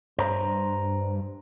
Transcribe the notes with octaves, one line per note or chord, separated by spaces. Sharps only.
G2 C5 A#5